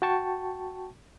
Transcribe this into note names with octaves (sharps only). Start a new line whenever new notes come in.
F#4 G5 A5 C#6